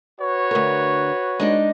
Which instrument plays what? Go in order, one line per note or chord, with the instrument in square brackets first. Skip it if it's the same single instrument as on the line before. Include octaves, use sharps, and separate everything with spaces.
[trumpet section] F#4 B4 C#5
[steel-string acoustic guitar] D2 A#4
G#3 D4 D#4